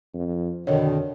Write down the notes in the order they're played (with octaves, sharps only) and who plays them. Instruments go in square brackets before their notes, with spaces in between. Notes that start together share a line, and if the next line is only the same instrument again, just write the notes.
[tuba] F2
[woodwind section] F2 B2 D#3 [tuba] D3 [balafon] C#5 D#5